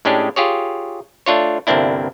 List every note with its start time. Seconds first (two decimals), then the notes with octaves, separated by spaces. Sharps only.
0.05 A2 G#3 C#4 D4 G4 G#4
0.36 F4 G4 G#4 C#5
1.26 A3 D4 F4 C#5
1.67 G1 C2 A#3 C4 D4 E4